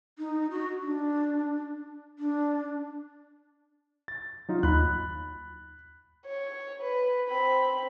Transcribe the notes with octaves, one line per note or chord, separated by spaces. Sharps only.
D#4
F#4
D4
D4
A6
F#3 D#4 F4
D#2 B5 F#6
C#5
B4
C4 B5